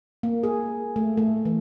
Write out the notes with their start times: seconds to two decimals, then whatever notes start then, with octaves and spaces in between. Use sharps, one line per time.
0.23 A#3
0.43 G#4
0.96 A3
1.17 A3
1.45 E3